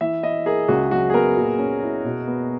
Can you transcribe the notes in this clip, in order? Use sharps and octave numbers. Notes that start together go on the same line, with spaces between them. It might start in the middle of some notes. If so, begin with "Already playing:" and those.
E3 E5
E4 D#5
G#4 A#4
C#2 F#4
F#3 F#4
G#4
B3 A#4
A#2
C#4
E4
B2
B3